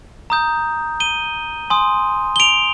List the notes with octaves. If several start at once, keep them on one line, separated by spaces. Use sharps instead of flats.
A#5 D#6 G6
D#7 G7
G#5 C6 D#6
G7
D7 F7